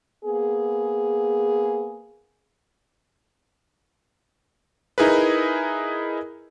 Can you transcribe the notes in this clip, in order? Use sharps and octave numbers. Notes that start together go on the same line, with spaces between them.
A#3 B3 G#4
D#4 E4 G#4 A#4 B4